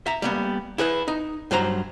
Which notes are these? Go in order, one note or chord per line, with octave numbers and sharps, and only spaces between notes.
E5 A#5
G3 A#3 B3
E4 G#4 B4 E5
D#4
G2 F#3 C5 A#5